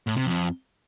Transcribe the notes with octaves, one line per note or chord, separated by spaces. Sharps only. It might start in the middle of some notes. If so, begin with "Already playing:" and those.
A2
C3
F2